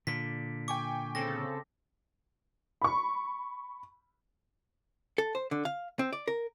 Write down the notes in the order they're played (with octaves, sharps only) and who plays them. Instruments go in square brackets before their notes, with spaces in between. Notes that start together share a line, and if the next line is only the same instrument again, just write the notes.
[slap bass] A#2 D3 [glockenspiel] B6
[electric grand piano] G5 G#5 C#6 [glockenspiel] D6
[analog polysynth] C#3 C4 A4 [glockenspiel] A#6
[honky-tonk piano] B5 C#6
[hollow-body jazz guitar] A4
C5
D3
F5
C4
D5
A#4